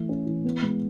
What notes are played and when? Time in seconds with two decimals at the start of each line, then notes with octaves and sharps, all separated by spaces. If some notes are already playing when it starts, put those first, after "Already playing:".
Already playing: E3 A3
0.09 C#4
0.26 E3
0.44 B3
0.62 G#3